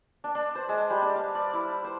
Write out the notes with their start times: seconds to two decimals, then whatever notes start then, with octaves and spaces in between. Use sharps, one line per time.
0.24 D4
0.35 D4
0.55 C5
0.69 G#3
0.90 G3
1.02 D4
1.15 F5
1.35 D5
1.53 E4
1.84 C5